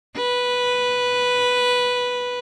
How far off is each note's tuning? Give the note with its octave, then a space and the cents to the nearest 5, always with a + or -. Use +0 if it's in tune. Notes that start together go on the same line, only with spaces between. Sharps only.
B4 -5